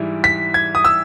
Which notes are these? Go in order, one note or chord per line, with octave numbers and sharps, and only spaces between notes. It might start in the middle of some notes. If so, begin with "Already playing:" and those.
Already playing: G#2 E3 G3 E4
B6
G#6
D#6
E6